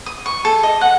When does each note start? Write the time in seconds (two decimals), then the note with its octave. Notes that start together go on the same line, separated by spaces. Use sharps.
0.06 D#6
0.26 C#6
0.45 A4
0.63 D#5
0.81 F#5